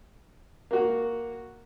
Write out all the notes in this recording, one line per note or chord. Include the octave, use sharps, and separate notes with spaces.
A#3 F#4